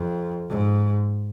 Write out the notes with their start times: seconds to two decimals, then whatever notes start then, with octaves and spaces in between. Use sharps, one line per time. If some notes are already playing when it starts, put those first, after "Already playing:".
Already playing: F2
0.49 G#2